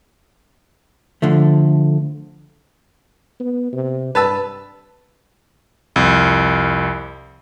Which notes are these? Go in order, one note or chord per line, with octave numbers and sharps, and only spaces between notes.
D3 F3 A3
B3
C3
G2 B4 A5 E6
C2 F2